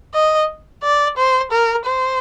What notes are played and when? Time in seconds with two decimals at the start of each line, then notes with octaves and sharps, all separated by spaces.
0.14 D#5
0.83 D5
1.17 C5
1.51 A#4
1.85 C5